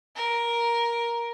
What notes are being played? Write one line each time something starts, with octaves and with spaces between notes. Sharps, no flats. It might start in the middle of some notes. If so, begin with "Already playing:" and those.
A#4